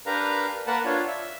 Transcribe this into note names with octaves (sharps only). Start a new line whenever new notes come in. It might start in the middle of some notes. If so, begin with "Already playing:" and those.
D4 G4 A#4 B4 F5 A#5
A#3 A#4 B4 F#5 A5
D4 F4 C#5
E5